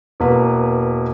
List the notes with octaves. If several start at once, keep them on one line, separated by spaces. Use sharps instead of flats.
E1 A#3 B4